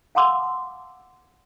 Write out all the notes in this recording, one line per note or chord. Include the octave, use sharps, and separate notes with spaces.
F5 F#5 A5 C6 D6 E6